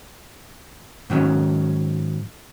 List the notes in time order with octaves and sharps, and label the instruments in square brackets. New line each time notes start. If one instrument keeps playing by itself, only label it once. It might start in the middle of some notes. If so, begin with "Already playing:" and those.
[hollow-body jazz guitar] G#2 D#3 F#3 C#4